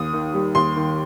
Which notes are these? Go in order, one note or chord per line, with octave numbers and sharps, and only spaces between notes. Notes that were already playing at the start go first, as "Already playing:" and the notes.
Already playing: D#2 D#6
D#3
G3
D#2 C6
D#3